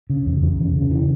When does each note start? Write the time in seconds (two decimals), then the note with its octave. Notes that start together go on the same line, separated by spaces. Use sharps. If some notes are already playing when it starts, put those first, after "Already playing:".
0.10 C#3
0.26 E2
0.42 E2
0.59 C#3
0.75 C#3
0.91 E3